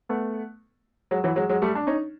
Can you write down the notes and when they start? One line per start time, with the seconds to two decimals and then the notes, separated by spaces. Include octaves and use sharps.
0.09 A3 B3
1.11 F#3 G#3
1.24 E3 F#3
1.36 F#3 G#3
1.49 F#3 G#3
1.62 G3 A3
1.75 D4
1.87 C#4 D#4